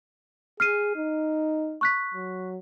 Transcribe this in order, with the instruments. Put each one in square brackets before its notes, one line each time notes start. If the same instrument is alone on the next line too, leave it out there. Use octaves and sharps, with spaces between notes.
[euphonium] G#4 [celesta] F6 C7 D#7
[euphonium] D#4
[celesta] C#6 F#6 B6
[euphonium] F#3